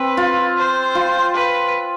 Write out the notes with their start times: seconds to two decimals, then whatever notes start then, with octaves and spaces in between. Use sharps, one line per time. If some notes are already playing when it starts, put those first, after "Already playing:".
Already playing: C4 B4
0.17 F4
0.56 C5
0.95 F4
1.34 B4